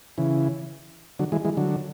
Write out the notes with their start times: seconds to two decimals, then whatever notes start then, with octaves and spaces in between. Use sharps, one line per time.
0.18 C#3 E3
1.19 D3 F#3
1.32 E3 G#3
1.45 E3 G#3
1.57 D3 F#3